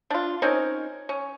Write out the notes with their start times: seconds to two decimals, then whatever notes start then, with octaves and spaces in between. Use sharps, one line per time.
0.10 D4 F4
0.42 C4 C#4 D#4 A#4
1.09 C#4